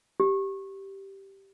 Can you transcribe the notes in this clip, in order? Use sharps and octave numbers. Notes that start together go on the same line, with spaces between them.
G4